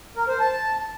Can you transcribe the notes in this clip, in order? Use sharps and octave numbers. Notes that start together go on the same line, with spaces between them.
A#4
C5
A5